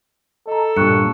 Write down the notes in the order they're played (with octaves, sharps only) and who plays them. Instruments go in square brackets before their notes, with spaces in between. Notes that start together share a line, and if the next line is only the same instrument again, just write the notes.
[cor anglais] A4 [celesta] D#5 A#5
[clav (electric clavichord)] G2 A#2 [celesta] C#6 F#6 C#7